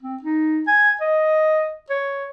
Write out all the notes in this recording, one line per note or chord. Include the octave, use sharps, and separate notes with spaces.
C4
D#4
G#5
D#5
C#5